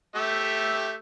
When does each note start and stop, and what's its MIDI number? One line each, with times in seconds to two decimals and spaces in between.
0.15 0.95 57
0.15 0.95 67
0.15 0.95 76